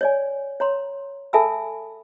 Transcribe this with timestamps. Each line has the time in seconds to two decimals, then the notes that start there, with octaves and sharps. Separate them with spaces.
0.01 C#5 D5 G#5
0.60 C#5 A#5 C6
1.33 A4 E5 G#5 A5 B5 E6